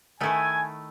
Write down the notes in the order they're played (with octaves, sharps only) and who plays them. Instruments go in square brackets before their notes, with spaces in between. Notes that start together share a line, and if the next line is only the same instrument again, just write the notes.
[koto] D#3 A3 E4 A4 [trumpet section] G#5